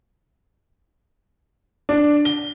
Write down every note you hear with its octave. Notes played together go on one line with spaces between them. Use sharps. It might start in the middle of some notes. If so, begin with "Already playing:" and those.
D4
G7